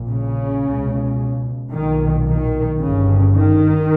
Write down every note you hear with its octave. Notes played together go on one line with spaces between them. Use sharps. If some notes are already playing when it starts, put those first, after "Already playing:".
Already playing: A#1 A#2
C#3
C#2 B2
B1 A#2 D#3
D#3
G1 G2 C#3
D#3